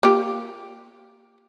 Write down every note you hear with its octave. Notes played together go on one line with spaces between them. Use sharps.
A#3 F4 G4